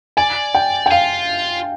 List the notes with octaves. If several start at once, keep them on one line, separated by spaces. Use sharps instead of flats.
D5 G#5
G5
G5
F4 F5